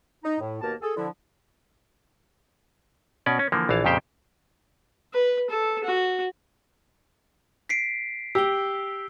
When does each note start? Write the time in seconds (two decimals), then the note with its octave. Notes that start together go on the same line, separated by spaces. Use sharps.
0.24 D#4
0.40 A2
0.62 D#2 B2 A#3 A#4 A5
0.81 G#4 A4
0.96 D3 F3 E4
3.26 B2 C#4 D5
3.39 C#4
3.52 D3 E3 F3 A#3
3.69 A#1 E3 F5 A5
3.85 F2 A#2 C#3 G4 C5 G5
5.14 B4
5.50 A4
5.84 F#4
7.69 B6 C7 D7
8.35 G4 E6 G7